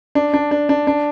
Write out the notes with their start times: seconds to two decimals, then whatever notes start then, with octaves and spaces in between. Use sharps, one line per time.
0.15 D4
0.34 D4
0.51 D4
0.69 D4
0.87 D4